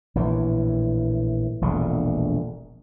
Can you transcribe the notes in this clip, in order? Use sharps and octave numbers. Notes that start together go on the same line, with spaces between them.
A#1 A2 E3
E1 A#1 D3